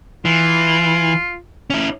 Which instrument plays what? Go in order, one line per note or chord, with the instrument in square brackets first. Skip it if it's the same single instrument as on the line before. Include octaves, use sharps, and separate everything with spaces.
[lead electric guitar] E3 [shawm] F4
[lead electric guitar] C#4 E4